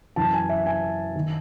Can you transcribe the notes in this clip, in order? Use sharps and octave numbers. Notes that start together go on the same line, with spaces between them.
F#2 E3 A5
G#5
E5
G#5
D#3